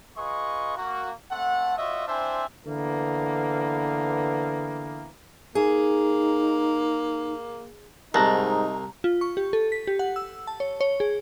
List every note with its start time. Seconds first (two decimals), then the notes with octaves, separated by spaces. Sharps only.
0.17 F4 G#4 B4 D#5 C#6
0.77 A#3 F#4
1.31 A3 C4 A4 F#5
1.77 F4 F#4 C#5 D#5 E5
2.08 C4 D4 E4 C5 E5 G#5
2.65 D3 E3 A#3 B3
5.55 A#3 D#4 G#4
8.14 C2 G#2 D#4 A5 A#5 F#6
9.04 F4
9.21 C#6
9.37 G4
9.53 A4
9.72 B6
9.87 G4
9.99 F#5
10.16 E6
10.47 A5
10.60 C#5
10.81 C#5
11.00 G#4